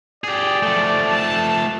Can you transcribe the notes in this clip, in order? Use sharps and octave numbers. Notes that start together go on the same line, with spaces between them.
G4 G#4 D5
F3 A3
A5